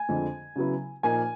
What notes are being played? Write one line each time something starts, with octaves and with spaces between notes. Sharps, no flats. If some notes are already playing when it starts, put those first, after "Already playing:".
Already playing: G#5
F2 D3 F3 G#3
C#3 F#3 B3 E4
A#2 F3 A#3 D#4 G#5